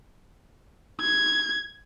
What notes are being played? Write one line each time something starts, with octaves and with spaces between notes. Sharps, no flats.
G#6